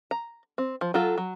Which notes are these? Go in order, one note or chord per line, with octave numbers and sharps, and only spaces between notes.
A#5
C4
F3
F#3 F4 A4
F#3